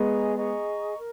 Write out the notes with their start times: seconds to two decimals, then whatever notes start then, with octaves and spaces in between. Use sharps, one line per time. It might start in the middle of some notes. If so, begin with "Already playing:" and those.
Already playing: G#3 B3 G#4 D#5 A#5 C#6
0.35 G#4 D#5 A#5 C#6
0.97 A#4